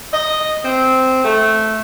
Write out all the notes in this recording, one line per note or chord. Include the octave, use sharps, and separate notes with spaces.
D#5
C4
A3